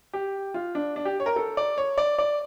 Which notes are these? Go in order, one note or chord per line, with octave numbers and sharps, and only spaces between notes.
G4
F4
D4
D4
G4
C#5
A#4
A4
D5
C#5
D5
D5